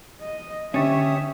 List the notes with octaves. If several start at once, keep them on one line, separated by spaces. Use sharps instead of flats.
D#5
D3 C#4 D4 G4 C#5 E5 D#6